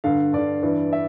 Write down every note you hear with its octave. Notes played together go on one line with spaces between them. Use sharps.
G2 D3 F5
G2 D3 D5
G2 E3
E5